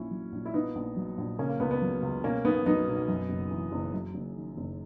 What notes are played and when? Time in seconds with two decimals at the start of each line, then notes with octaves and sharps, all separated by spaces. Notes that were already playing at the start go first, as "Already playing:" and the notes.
Already playing: A#1 A#2 C#4 E4
0.11 F#3
0.32 A#1
0.45 E4
0.54 A#2 B3 D#4
0.75 A#1
0.96 F#3
1.18 A#1
1.39 C#3 A#3 C#4
1.49 A#3
1.60 C#2 B3
1.71 B3
1.82 F#3
2.02 C#2
2.24 B2 A#3 C#4
2.44 B1 B3 D#4
2.66 F#3 B3 D#4
2.87 B1
3.08 F#2
3.29 F#1
3.51 E3
3.72 F#1
3.94 F#2
4.14 F#1
4.36 D#3
4.57 F#1